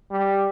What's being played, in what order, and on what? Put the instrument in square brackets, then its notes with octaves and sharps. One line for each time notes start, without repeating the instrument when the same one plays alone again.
[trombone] G3